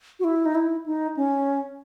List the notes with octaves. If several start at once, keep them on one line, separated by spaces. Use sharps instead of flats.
F#4
E4
D#4
E4
D#4
C#4